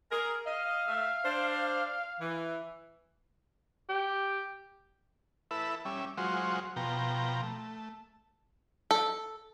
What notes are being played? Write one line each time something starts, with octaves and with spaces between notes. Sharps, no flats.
G#4 A#4
D#5 F5
A3 E5
D4 C5
E3
G4
E4 A4 B4 E5
G3 C#4 E5
F#3 G#3 F4 F#4 C5
B2 F3 G5 A#5
A3
A4